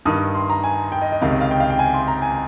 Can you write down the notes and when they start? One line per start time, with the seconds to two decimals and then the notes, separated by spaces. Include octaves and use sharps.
0.05 G2 D#3 D#6
0.35 C6
0.50 A#5
0.64 G#5
0.92 G5
1.02 D#5
1.12 D#5
1.22 C#2 C3 D#3 F5
1.32 D#5
1.41 F5
1.51 G5
1.60 F5
1.70 G5
1.79 G#5
1.94 C6
2.08 A#5
2.22 G#5